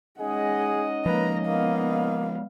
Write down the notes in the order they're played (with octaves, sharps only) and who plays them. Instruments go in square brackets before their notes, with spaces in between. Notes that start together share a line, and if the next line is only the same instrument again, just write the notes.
[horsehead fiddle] G#3 F#5 [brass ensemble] C#4 D#4 D#5 [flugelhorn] G#4
[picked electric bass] F3 G#3 [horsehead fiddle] A#3 A#5 [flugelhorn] B4
[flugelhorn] A#3 [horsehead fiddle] B3 F5